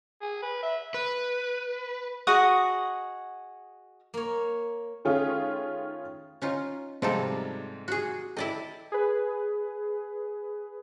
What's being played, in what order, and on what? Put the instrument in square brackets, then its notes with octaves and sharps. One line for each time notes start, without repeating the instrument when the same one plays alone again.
[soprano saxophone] G#4
B4
E5
[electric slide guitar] B4
[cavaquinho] F#4 G#4 D#5 F#5
[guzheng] A#3 C#5
[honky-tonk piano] D#3 A3 C#4 F4 G#4
[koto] C#4 D#4 F4
[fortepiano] G#2 C3 G3 [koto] F3 D#4 A4
[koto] F#4 G#4
[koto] E4 D5 D#5 [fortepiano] A4 G5
[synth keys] G#4 B4